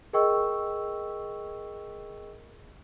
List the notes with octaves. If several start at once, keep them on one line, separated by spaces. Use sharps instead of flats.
G#4 A#4 D#5 G5 C#6 E6